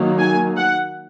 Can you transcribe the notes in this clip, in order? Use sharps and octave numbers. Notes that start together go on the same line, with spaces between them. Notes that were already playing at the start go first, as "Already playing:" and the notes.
Already playing: D#3 F#3 A#3
G#5
F#5